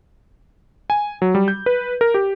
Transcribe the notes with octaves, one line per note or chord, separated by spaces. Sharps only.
G#5
F#3
G3
G6
B4
A#4
G4